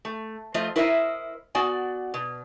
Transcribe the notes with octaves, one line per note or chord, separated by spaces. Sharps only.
A3
F3 A3 F4 C5 D#5
E4 A#4 C5 C#5 D#5 E5
B3 F#4 D5 F#5 G#5
B2